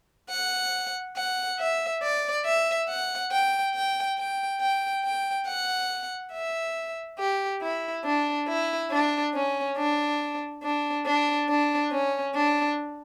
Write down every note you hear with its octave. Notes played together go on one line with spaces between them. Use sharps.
F#5
F#5
E5
D5
E5
F#5
G5
G5
G5
G5
G5
F#5
E5
G4
E4
D4
E4
D4
C#4
D4
D4
D4
D4
C#4
D4